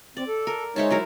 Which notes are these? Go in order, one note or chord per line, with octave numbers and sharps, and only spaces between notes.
C4 D5
A4
A#4
G#3 D#4 C5 C#5 E5 A5
F#3 E4 A#4